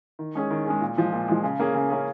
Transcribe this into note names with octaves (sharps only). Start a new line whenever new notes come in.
D#3
G#3 C#4 G#4
D#3
G#3 C#4 G#4
A#2
F3 G#3
A#2
F3 G#3
C#3
A#3 C#4 G#4
C#3
A#3 C#4 G#4